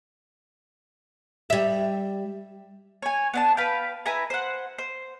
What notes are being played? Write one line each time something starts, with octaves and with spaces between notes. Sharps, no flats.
G3 E5
C#5 G#5
B3 D4 A5
B4 F5 G5
E4 B4 G#5 A#5
C5 F#5
C5